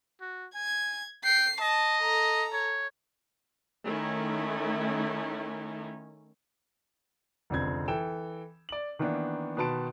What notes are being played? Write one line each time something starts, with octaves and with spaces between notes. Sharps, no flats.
F#4
G#5 G#6
G5 C7
D#5 A5
A4 A#5
C#5
D#3 A3 C#4 E4
F1 C#2 D3 C4 G#6
E3 A4 G5 E7
D5 F#7
D#3 E3 A#3 B3 D4
B2 D#3 B4 A5 C6 D7